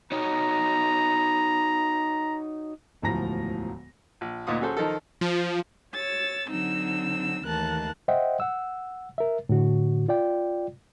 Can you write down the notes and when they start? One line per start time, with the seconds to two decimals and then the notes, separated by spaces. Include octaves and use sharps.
0.12 D#4 F#4 C#5 A#5
3.02 E1 D2 A2 F3 A#5 A#6
4.21 A#1
4.47 D2 A#2 D#4 F4 F#5 D#6
4.60 F#3 C#4 G#4 A4 C5
4.77 D#3 F3 D#4 A4
5.21 F3
5.94 C#5 E6 A6
6.50 D3 F#3 C4 D#4 E6
7.46 D#2 E3 A3 A#4 A5 F#6
8.08 C5 D#5 E5 F#5 G5
8.40 F#5 E6
9.18 A#4 E5
9.49 A2 D3 F#4
10.08 F4 D5 G5